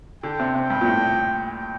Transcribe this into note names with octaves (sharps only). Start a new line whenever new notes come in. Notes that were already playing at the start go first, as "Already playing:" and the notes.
D3 G5
C3
C3 G5
G2
A#2
A2
G5